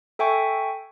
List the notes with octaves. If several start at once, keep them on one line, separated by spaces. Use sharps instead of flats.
A4 E5 G5 G#5 C#6